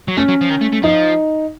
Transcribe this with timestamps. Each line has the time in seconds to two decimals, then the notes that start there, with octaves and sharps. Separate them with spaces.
0.08 F#3
0.17 A3 C#4
0.28 F#3
0.41 F3
0.50 D#3
0.61 A3
0.73 A3
0.83 F3 D#4